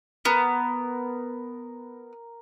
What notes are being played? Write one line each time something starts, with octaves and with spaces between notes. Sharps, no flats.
B3 A#4